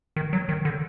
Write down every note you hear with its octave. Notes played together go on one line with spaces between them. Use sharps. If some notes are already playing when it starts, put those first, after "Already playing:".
D#3
F#3
D#3
D3